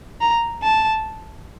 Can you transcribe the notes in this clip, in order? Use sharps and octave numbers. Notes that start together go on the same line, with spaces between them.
A#5
A5